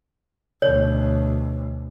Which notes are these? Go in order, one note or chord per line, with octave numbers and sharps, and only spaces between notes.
D2 B2 C#5